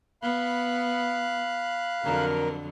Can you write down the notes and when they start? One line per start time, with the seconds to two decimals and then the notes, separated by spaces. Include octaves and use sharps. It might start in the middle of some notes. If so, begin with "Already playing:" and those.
0.23 B3 F5 B5 F#6
2.03 F2 D3 F#3 A#4